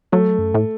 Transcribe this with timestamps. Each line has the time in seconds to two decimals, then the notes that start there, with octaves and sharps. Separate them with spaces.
0.12 F#3 A3
0.39 F#2
0.54 A2